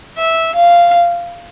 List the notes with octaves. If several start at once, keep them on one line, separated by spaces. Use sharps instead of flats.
E5
F5